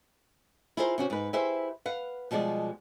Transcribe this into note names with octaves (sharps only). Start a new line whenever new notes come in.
E4 F4 G#4 A#4 C5
C3 C#4 F#4
G#2 B4
E4 G4 G#4 B4 C5 E5
B4 F5 F#5
B2 F3 G3 G#3 D5